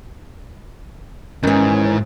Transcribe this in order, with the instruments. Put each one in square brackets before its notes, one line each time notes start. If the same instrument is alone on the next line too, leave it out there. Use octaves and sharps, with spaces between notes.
[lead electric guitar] E2 G#2 [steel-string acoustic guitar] D#3 E3 [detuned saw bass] C#4